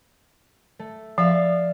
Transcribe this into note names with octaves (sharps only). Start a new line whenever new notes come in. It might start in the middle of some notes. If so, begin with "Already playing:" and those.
A3
F3 D5 E5 F5